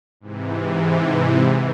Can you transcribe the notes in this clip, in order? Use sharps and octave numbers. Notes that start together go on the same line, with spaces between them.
G#2 C3 E3